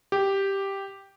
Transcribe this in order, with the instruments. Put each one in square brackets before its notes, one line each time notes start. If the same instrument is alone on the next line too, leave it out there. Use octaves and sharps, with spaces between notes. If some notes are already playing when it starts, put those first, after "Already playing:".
[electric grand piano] G4